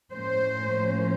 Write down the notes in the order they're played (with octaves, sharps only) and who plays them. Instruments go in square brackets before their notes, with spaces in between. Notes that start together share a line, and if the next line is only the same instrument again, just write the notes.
[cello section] A2 F3 A#3 C#4 C5